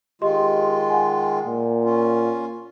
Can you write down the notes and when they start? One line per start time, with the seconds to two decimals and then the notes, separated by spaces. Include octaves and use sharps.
0.22 D#3 G#3 F4 G4 D#5 C6
0.89 F#5 G#5
1.46 A#2
1.85 C#4 F4